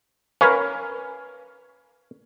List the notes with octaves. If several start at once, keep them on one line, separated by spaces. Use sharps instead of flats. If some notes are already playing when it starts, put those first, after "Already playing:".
C#4 A#4 B4 F5